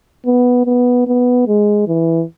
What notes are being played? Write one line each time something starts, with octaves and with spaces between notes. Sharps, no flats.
B3
B3
B3
G#3
E3